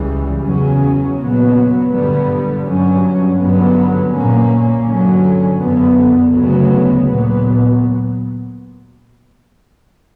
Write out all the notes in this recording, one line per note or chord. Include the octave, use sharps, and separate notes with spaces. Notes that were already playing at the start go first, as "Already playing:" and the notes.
Already playing: C#2 C#3 E3 G3
E2 C#3 F#3 C#4
A#2 F#3 B3
G2 D3 G3 B3
G2 F#3 C#4
G2 D3 F#3 B3
A#2 A#3 C#4
G2 D3 F#3 C#4
F#2 D3 F#3 B3
D2 C#3 F#3 B3
A#2 F#3 B3